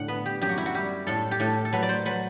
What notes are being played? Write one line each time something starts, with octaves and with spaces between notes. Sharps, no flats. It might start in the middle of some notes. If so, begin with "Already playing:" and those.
Already playing: A2 D3 F#5
B3 B4
G4
F#2 G4
F#4
E4
F#4
G3 G4
A2 A4
G4
A2 A4
A4
F#3 B4
D5
C5
F#3 B4